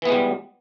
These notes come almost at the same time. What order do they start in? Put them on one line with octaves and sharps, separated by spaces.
E3 B3 G#3 G3